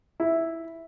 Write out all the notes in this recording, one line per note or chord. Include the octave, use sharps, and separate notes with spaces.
E4